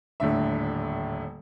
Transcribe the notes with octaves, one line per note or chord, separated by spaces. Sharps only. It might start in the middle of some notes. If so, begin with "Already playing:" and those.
D#1 A2 D3 E5